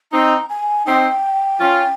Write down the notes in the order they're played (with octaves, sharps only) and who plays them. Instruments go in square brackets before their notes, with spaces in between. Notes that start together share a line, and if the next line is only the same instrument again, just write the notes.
[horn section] C4 D#4 [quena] A#5
[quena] G#5
[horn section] C4 D#4 [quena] G5
[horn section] C#4 F4